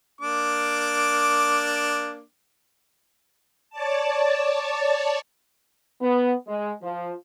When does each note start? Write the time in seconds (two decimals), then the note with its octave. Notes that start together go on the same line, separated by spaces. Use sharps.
0.21 A#3 D4 D6
3.70 C#5 D5 A5
6.01 B3
6.47 G#3
6.82 F3